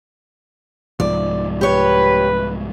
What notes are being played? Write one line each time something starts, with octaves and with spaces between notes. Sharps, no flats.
C2 G#2 F3 D5
G4 B4 C#5